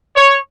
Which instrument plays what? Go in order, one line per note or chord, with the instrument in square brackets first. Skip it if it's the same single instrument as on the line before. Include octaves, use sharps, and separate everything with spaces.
[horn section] C#5